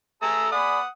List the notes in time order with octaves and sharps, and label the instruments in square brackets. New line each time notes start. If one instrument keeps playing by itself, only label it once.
[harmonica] A3 A#5 E6 [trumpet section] G#4 A4
[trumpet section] G#4 D5 B5 [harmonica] F#5 D#6